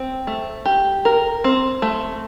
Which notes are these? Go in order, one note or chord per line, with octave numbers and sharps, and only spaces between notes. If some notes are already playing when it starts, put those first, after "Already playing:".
Already playing: C4
A3
G4
A#4
C4
A3